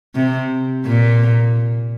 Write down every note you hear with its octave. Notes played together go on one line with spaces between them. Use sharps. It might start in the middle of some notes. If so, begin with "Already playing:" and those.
C3
A#2